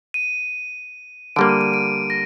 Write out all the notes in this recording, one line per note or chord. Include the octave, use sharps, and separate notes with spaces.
D#7
D3 G3 A#3 D7
D#7
D#7
D7
A#6